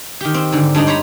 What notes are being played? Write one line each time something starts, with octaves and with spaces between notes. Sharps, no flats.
D#3 G4
C4
G#2 D3
G2 D4 D#4 D#5
C5 C#5 A#5 B5